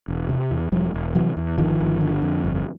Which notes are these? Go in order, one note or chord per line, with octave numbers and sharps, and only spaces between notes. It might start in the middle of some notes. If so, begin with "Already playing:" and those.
E1
C3
E2
E1 F3 G3
E1
C3 E3 F#3
E2
G1 D#3 F3
G1
D3
F2
G1